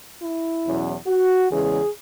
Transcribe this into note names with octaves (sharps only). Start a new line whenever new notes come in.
E4
E2 B2 F#3 C#4
F#4
E2 C#3 E3 G#3 C#4 G#4